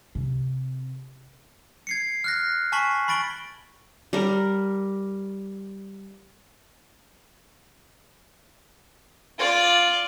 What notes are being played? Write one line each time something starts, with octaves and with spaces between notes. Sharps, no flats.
C3
G#6 C7 C#7
F6 F#6 A#6
G#5 A5 C#6 B6 F#7
B5 C#6 A6 D7 F#7 G7
G3 A#4
F4 D5